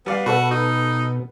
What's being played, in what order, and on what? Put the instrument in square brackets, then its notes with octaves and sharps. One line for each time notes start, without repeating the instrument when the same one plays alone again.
[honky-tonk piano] G3 D5 F5 [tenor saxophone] B3
[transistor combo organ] B2 [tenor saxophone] F#4 [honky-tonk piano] A4 B4
[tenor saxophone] D#4